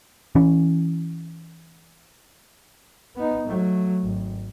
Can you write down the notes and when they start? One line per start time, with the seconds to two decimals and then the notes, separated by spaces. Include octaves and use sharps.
0.35 E3 C#4
3.16 B3 D#4
3.47 F#3 A3
4.03 G#1